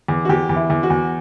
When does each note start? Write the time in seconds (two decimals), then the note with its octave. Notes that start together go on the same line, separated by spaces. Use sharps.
0.08 E2
0.25 F#4
0.29 E2 G4
0.49 E2
0.56 E4
0.70 E2
0.83 F#4
0.90 E2